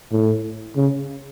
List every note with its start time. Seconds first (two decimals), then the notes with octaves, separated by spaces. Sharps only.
0.12 A2
0.76 C#3